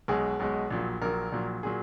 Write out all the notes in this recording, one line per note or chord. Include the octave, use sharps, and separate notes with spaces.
B1 B2 G#3 G#4
B1 B2 G#3
A#1 A#2 F#3
A#1 A#2 F#3 A#4
A#1 A#2 F#3
A#2 F#3 G#4